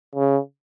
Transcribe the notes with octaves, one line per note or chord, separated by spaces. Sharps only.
C#3